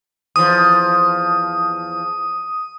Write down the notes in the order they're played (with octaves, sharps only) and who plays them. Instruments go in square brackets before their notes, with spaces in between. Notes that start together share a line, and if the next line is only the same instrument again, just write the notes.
[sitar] E2 F3 [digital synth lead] D#6